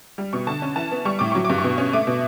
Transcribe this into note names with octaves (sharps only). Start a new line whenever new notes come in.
G3
B2 C#6
D3 A5
C#4
E3 A5
B3
G3 C#6
A2 D6
F#3 C#6
D6
G2
C#6
B2
C#4
A3 D6
B2